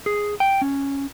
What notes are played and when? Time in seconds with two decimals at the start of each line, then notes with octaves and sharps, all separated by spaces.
0.06 G#4
0.40 G5
0.62 C#4